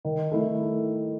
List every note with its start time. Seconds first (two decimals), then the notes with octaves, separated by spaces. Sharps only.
0.05 D#3
0.32 A3 E4 A4